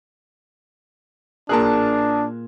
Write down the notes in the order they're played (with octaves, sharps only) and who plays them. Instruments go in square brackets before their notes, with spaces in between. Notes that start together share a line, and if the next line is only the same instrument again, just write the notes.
[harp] A#2 F4 F#6 [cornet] D4 [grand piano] G#4 A#4 A5